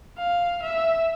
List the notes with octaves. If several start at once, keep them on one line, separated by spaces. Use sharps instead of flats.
F5
E5